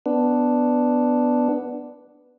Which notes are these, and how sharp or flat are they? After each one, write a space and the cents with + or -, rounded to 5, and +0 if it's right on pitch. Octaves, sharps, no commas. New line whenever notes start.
B3 +5 D4 +0